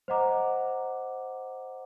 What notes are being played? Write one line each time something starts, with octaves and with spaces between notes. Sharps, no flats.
C5 D#5 F#5 A#5 D6